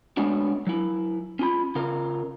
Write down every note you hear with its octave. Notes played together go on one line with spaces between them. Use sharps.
G#3 A3 B3 C#4 D4 F#4
F#3 E4
C#4 F4 B5
C#3 F4 A#4